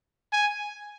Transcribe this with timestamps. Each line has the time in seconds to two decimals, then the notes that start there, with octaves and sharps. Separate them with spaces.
0.32 G#5